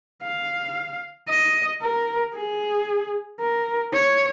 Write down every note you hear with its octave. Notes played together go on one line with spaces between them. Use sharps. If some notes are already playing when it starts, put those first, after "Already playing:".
F5
D#5
A#4
G#4
A#4
C#5